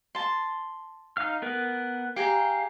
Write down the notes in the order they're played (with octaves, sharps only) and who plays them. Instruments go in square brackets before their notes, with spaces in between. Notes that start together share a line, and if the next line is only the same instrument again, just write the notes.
[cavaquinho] A5 C6
[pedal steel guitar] D#4 F5 F6
B3 A#4 B4
[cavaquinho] G4 G#4 A#5 [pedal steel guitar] F5